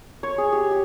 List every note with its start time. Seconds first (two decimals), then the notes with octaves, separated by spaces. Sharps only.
0.23 C#5
0.38 G#4
0.52 G4
0.71 G4